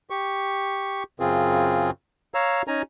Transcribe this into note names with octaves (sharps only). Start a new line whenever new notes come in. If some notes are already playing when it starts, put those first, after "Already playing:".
G4 C#6
F#2 C#3 C4 F4 G#4
C#5 F5 A#5 E6
C#4 D#4 G#5 A#5